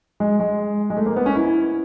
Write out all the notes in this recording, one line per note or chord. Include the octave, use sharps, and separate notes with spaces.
G#3
G#3
G#3
A3
A#3
B3
C#4
E4